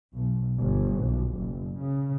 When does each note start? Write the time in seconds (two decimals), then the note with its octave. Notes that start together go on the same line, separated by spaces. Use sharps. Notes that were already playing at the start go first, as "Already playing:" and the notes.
0.14 B1
0.57 G1
1.03 B1
1.36 F#1
1.78 C#3